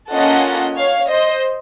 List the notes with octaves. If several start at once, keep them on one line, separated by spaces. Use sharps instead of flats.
A#3 C#4 F4 A4 D#5 F#5
C#5 F5
C5 D#5